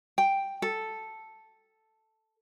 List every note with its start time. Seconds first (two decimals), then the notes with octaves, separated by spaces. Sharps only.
0.18 G5
0.62 A4